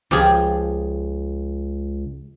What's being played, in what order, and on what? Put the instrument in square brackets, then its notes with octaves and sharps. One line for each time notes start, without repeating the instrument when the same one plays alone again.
[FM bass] C#2 [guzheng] F3 G4 G#4